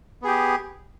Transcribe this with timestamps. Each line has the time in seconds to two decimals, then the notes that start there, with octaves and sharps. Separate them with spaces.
0.22 B3
0.24 G#4
0.27 G4